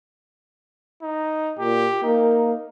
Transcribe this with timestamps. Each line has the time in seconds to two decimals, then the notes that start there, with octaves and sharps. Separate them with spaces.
1.02 D#4
1.59 A#2 G4
2.03 A#3 D#4